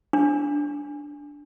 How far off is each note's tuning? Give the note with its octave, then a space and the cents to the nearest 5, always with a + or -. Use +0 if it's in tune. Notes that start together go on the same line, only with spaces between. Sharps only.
D4 -5